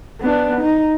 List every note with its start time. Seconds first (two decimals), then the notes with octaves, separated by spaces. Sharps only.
0.21 B3 D4
0.60 D#4